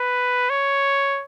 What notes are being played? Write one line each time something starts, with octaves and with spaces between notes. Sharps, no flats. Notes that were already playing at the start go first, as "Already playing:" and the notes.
Already playing: B4
C#5